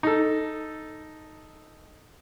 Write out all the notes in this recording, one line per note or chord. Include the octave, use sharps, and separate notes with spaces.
D#4 A4